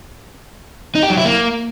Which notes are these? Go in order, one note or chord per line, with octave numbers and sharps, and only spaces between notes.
D#4
G4
F#3
E4
A#3